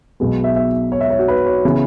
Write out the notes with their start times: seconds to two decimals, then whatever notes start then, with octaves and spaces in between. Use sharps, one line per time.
0.20 B1 B2 G#3 B3
0.44 E5
0.56 E5
0.92 C#5
1.01 E5
1.10 C#5
1.19 F#4
1.28 B4
1.46 C#5
1.65 C#3 E3 B3